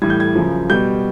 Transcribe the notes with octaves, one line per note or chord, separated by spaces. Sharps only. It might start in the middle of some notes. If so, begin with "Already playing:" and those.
A2 E3 G3 G#6
G6
G#6
F#2 C#3 F3
B2 G3 G6